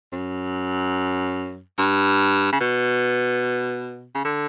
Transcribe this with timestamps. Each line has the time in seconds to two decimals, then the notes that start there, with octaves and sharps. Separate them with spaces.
0.12 F#2
1.78 G2
2.52 C#3
2.60 B2
4.15 C#3
4.25 D3